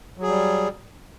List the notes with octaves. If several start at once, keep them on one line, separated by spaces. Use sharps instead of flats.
F#3 G3 G#4